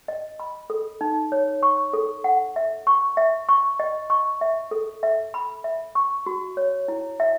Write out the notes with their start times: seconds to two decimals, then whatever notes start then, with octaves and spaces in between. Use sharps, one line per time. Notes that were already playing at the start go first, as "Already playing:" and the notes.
0.08 D#5
0.40 B5
0.70 A4
1.01 D#4
1.32 C#5
1.63 C#6
1.93 A4
2.24 F#5
2.56 E5
2.87 C#6
3.17 E5
3.49 C#6
3.80 D#5
4.10 C#6
4.41 E5
4.71 A4
5.03 E5
5.34 B5
5.64 E5
5.95 C#6
6.26 F#4
6.57 C#5
6.88 E4
7.20 E5